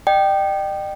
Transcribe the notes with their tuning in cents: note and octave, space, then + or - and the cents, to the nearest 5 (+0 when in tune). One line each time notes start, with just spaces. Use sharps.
D#5 -45 G5 -10